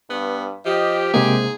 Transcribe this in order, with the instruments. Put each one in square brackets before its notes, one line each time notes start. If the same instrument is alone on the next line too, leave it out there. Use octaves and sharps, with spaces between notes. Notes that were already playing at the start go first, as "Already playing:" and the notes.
[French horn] G2 [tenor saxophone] B3
[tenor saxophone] F3 [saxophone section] G4 [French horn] D#5
[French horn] G#2 [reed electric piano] C3 G#3 A#3 [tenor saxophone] G#4